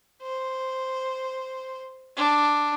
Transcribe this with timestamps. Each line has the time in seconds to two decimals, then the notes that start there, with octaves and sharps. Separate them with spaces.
0.22 C5
2.16 D4